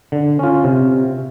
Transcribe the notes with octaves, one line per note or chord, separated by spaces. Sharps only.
D3
C#4 F4
C3